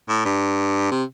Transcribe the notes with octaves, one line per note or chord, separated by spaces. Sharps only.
A2
G2
C3